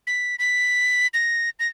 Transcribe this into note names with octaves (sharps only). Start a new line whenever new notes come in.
B6
B6
A#6
A#6